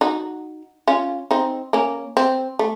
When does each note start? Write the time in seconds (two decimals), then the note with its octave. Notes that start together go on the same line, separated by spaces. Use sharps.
0.01 D#4 F#4
0.88 C#4 F4
1.31 C4 D#4
1.73 A#3 C#4
2.17 C4
2.59 A3